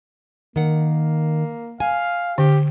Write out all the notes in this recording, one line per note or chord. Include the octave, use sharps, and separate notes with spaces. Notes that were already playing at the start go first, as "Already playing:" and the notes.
D#3 A#3 F#5
F5 G#5
D3 G4